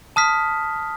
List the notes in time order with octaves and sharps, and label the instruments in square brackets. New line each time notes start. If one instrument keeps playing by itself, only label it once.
[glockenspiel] A5 D#6 F6 B6